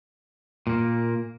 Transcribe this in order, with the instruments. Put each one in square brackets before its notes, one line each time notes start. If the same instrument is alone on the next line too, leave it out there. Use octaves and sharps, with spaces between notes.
[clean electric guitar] A#2 A#3